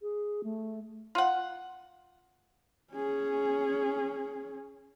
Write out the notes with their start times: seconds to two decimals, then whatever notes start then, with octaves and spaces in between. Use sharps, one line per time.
0.02 G#4
0.44 A3
1.15 F4 F#5
2.93 C#4 G#4